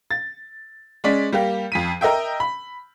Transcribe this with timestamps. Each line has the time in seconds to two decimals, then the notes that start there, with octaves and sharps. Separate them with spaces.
0.11 A6
1.04 G#3 C#4 D5 B6
1.33 G3 A#3 G4
1.72 F2 B6 D#7
2.01 A#4 D#5 E5 G5
2.40 B5